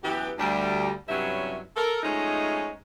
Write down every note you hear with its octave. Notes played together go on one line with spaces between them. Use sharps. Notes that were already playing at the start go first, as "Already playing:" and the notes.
F#2 E3 B3 G4
D2 G3 D4
G2 C3 F#3 C#4 E4 E5
A4 A#4
F3 G#3 A3 C#4 D#4